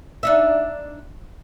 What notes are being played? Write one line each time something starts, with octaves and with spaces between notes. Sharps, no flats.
D4 D#4 E5